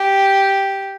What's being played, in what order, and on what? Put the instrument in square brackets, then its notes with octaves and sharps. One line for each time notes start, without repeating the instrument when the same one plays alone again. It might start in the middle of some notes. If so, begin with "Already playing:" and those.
Already playing: [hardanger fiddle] G4